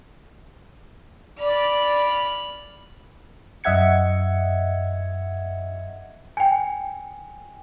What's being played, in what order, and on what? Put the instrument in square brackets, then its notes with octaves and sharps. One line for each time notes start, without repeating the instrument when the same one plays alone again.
[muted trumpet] D5 [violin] B5 F6
[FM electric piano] F#2 D#5 E5 F#5 G#6 C#7
[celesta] G5 G#5